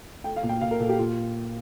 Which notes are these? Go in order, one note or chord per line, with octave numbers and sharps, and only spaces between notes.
A3 G5
F5
A#2
G5
A#2 F5
A#4
A#2 A4
G4
A#2 F4